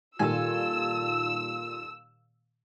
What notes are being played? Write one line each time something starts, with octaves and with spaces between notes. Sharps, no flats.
A#2 D#3 G3 F4 A4 G#5 E6